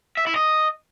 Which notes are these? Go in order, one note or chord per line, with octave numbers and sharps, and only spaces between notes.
E5
E4
D#5